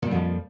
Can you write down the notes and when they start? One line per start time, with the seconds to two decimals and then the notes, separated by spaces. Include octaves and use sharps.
0.02 A#2
0.06 G3
0.11 F2
0.15 F3